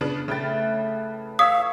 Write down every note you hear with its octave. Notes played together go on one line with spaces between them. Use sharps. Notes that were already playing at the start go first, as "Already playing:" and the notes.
C#3 B3 D4
A2 C#3 B4 G5 B5 A6
C#5 F5 D#6 E6 G#6 B6